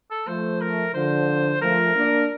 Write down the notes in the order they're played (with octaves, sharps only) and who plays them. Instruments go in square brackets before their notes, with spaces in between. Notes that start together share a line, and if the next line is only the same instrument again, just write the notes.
[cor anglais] A4
[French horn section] F3 A3 [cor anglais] C5
[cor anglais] A#4
[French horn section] D3 F3 [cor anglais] C5
[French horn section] F3 A3 [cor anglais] A#4
[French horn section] A#3 D4